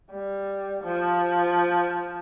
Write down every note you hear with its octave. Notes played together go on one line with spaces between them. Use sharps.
G3
F3